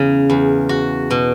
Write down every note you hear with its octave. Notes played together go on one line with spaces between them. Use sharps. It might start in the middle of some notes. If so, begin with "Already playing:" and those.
Already playing: E2 C#3
E2
F#4
B2